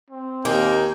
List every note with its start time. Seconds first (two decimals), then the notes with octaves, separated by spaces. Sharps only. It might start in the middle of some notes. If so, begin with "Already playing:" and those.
0.10 C4
0.45 D#2 A#3 D#4 G5 G#5